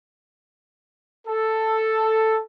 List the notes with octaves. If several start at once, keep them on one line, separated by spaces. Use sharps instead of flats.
A4